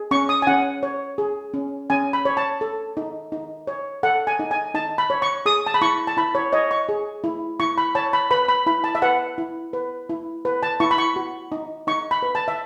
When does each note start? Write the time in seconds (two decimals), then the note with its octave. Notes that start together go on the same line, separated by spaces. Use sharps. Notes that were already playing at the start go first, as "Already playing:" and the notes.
Already playing: G#4
0.11 C#4 C#6
0.29 D#6
0.42 G#5
0.47 C#4 F#5
0.83 C#5
1.18 G#4
1.54 C#4
1.90 C#4 G#5
2.13 B5
2.25 C#5
2.37 A5
2.61 A4
2.97 D#4
3.32 D#4
3.67 C#5
4.03 A4 F#5
4.27 G#5
4.39 D#4
4.51 G#5
4.74 D#4 A5
4.98 B5
5.10 C#5
5.22 C#6
5.46 G#4 D#6
5.67 A5
5.74 B5
5.82 E4 C#6
6.07 A5
6.17 E4 B5
6.35 C#5
6.52 C#5 D#5
6.71 C#6
6.89 G#4
7.24 E4
7.60 E4 C#6
7.78 B5
7.95 C#5 A5
8.13 B5
8.31 B4 B5
8.48 B5
8.66 E4 B5
8.84 A5
8.95 E5
9.02 B4 F#5
9.38 E4
9.73 B4
10.09 E4
10.45 B4
10.63 A5
10.80 E4 C#6
10.91 B5
10.98 C#6
11.16 F#4
11.52 D#4
11.87 D#4 C#6
12.11 B5
12.22 B4
12.35 A5
12.48 E5